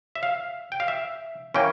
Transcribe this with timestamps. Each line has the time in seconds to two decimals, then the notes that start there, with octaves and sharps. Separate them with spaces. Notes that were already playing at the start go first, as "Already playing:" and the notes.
0.15 E5
0.23 F5
0.72 G5
0.80 F5
0.88 E5
1.54 E3 A#3 C#4 G5